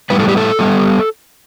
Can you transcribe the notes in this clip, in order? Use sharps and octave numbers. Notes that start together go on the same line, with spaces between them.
A2 G3 B3 B4
A4
G4
A4
A2 G3 B3